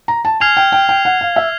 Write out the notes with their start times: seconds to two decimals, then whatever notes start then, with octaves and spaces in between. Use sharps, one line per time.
0.08 A#5
0.25 A5
0.40 G#5 F6 G#6 C7 F7
0.57 G5
0.72 G5
0.89 G5
1.05 F#5
1.21 F5
1.36 E5